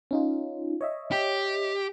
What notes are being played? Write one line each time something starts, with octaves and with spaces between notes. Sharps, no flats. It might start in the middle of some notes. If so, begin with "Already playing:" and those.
C#4 D#4 F4
C#5 D#5 E5
G4